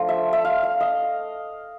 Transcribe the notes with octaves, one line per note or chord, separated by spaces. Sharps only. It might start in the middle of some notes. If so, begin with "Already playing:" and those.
Already playing: F3 A3 D4 F4
E5
E5
F5
F5
D#5